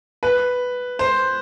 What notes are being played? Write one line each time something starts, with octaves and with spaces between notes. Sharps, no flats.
B4
C5